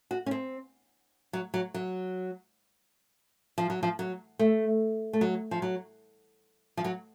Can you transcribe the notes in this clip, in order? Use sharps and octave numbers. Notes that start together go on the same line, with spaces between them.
F#4
C#4
C4
F#3
F#3
F#3
F3
F#3
F3
F#3
A3
A3
F#3
F3
F#3
F3
F#3